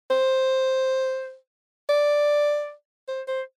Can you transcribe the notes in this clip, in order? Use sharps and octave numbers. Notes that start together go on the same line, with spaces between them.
C5
D5
C5
C5